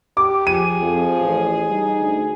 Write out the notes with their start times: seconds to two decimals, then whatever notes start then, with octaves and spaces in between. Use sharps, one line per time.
0.17 G4 D6
0.47 F3 G#4 D#7
0.81 F2 F3
1.19 A1
1.70 G3 D#4
2.00 D2